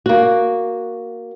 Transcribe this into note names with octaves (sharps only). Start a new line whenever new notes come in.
A#3 F#4